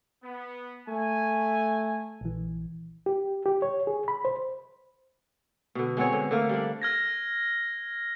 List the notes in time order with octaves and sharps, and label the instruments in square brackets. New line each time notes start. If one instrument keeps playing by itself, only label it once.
[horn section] B3
[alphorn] A3 [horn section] G#5
[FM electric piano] A#1 E3
[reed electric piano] G4
G4
C#5
G#4
B5
C5
[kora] B2 D3
G#3 B3 C4 C#5
D3
D3 A3 A#3 F5
G3 D4
[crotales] F6 G#6 A#6